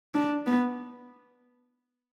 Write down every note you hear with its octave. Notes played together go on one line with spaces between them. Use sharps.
D4
B3